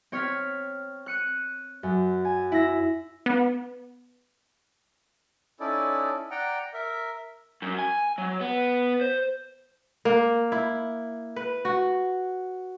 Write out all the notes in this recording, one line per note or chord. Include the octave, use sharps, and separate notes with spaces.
C4 C#5 F6 G#6 B6
F#6 C#7 D#7
F#2
G#5
E4 A#6
B3
C#4 D#4 E4 A4 D5
D5 F#5 G5 A#5
A#4 E5
F#2
G#5
F#3
B3
C5
A#3
E4
B4
F#4